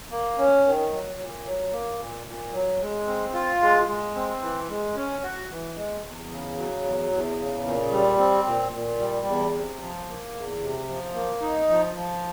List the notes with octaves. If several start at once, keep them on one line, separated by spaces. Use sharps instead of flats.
A#3
C#4
D#3
F#3
A#2
F#3
A#3
A#2
A#2
F#3
G#3
C4
F4
G#3
G#3
C4
E3
G#3
C#4
F#4
E3
G#3
E2
C#3
F#3
E2
E2
C#3
A#2
G3
C4
A#2
A#2
G3
E2
C3
F3
A#3
E2
C3
F3
A#3
D#4
F3
F3